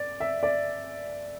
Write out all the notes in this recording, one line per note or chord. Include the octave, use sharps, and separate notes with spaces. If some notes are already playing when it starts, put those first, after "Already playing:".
Already playing: D5
E5
D5